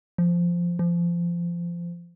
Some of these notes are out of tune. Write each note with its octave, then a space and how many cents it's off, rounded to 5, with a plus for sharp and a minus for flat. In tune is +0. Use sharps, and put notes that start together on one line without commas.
F3 -10
F3 -25